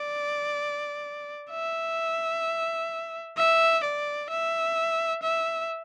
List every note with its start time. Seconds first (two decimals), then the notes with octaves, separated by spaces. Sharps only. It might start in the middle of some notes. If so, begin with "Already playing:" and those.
Already playing: D5
1.51 E5
3.37 E5
3.84 D5
4.30 E5
5.23 E5